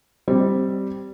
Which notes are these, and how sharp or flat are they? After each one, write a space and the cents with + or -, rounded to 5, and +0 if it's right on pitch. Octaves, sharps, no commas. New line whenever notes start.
G3 -10 C4 -5